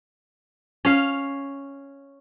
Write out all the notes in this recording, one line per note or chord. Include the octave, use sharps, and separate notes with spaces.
C#4 F5